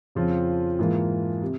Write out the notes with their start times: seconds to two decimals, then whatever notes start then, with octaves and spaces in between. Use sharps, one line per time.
0.15 F2 C#3 F3 C4 F4
0.79 G#2 E3 A#3 F4
1.42 C3